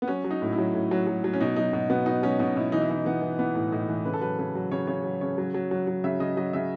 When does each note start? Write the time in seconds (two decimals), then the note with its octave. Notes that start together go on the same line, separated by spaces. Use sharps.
0.02 B3
0.08 F#3 C#4
0.24 F#3
0.31 D#4
0.42 A2
0.53 E4
0.58 F#3
0.74 A2
0.91 F#3
1.07 F#3
1.24 F#3
1.33 C#4
1.41 B2 D#4
1.56 F#3 D#4
1.73 B2
1.90 B2 B3
2.06 B2 D#4
2.23 F#3 C#4
2.39 B2 D#4
2.56 B2 E4
2.72 E3 D#4
2.82 E4
2.89 E3 D#4
3.05 E3 B3
3.22 E3
3.39 E3 B3
3.55 A2
3.72 A2 D#4
3.89 E3
4.05 C#3 B4
4.14 A4
4.21 F#3 B4
4.39 C#3 B4
4.55 F#3
4.71 C#3 C#5
4.87 C#3 C#5
5.04 F#3
5.21 C#3 C#5
5.38 F#3
5.54 F#3
5.71 F#3
5.87 F#3
6.04 C#3 E5
6.20 C#3 D#5
6.37 F#3 D#5
6.53 C#3 E5